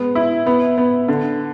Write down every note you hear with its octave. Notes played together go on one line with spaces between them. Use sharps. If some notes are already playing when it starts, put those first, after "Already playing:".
Already playing: G#3 B3
E4
B3
B3
D3